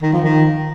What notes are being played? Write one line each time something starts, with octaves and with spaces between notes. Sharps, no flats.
D#3
F3
D#3